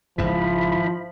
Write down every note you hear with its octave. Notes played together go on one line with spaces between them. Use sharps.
G#1 G#2 C#3 F3 E4 B5